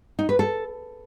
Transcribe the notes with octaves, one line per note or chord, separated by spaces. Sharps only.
D#4
B4
A4